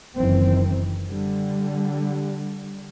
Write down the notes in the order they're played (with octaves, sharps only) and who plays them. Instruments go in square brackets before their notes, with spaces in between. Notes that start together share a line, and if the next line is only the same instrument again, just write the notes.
[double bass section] F#1 F#2 D#3 E3 C4
D3 G3